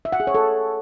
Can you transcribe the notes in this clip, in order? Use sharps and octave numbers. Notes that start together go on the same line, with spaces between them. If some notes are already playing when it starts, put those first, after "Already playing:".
E5
F#5
G#4
C#5
A4